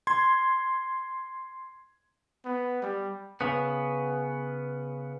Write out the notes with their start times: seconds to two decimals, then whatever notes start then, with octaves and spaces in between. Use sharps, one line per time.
0.07 C6 G#6
2.45 B3
2.82 G3
3.41 C#3 B3